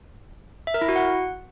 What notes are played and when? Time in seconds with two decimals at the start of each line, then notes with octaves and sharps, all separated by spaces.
0.67 E5
0.74 A#4
0.81 E4
0.89 F#4
0.96 F#5